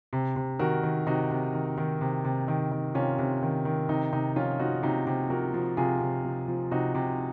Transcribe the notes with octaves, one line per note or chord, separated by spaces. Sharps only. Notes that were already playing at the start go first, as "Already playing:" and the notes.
C3
C3
D#3 F#4 A#4
D#3
C3 D#4 F#4
C3
D#3
D#3
C3
C3
D#3
D#3
C3 C#4 F4
C3
D#3
D#3
C3 D#4
C3 D#4
F3 C#4 F4
F3 D#4 F#4
C3 D#4 F#4
C3
F3 F#4 A#4
F3
C3 F4 G#4
C3
F3
F3
C3 D#4 F#4
C3